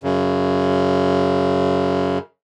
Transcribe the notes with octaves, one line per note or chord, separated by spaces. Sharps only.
F#2 C#3